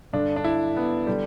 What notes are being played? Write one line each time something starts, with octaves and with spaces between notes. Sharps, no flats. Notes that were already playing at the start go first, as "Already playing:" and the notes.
G2 D3 D4
D4
E4
B3
D3 G3